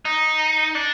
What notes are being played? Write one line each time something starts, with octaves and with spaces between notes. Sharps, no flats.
D#4
D4